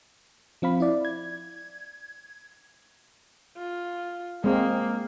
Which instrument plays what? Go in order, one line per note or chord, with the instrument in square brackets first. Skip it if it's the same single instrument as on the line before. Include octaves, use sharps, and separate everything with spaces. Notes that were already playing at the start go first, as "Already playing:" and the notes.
[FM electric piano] F3 C4 F5 B5
E4 D5
G#6
[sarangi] F4
[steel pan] G#3 C4 [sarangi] A#3